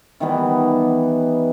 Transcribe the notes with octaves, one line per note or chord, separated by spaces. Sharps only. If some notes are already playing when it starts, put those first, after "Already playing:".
D#3 E3 G3 B3